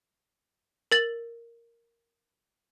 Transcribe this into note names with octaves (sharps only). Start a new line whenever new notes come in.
A#4 A6 F#7